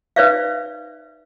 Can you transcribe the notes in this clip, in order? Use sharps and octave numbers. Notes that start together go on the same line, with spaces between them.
D#4 B4 C5 D5 E5 F5